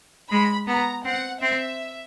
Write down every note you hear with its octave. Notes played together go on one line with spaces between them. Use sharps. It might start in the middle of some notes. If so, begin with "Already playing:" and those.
G#3 B5
B3 A#5
C4 F#5
C4 E5